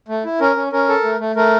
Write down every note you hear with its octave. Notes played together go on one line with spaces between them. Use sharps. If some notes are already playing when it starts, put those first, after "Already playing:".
A3
E4
C#4 A#4
C#4
C#4 A#4
A4
A3
A3
A3 A#4